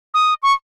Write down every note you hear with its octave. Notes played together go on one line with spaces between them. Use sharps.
D#6
C#6